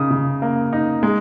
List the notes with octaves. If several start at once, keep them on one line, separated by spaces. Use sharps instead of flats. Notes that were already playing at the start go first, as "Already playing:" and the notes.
Already playing: C#3 D#4 D#6
C#3
A#3
D#4
G#3